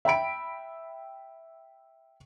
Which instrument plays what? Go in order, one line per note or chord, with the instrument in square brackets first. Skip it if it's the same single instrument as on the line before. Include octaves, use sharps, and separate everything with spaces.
[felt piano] E5 G5 B5 D7